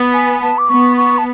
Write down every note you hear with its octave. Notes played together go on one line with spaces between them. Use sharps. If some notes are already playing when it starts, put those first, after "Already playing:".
Already playing: B3
G#5
A5
D6
B3 C#6
C#6
A5